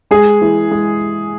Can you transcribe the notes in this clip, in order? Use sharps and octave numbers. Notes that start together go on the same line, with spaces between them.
G#3 G#4
E3
G#3